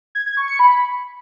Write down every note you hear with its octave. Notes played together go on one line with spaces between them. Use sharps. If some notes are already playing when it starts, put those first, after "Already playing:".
G#6
G#6
C#6
C#7
B5